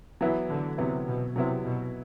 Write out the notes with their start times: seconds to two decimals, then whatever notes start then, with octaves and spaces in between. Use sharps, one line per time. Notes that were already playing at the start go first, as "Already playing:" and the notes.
0.21 E3 F#3 B3 E4
0.49 D3
0.78 C3 F#3 B3 E4
1.07 B2
1.36 C3 F#3 B3 E4
1.65 B2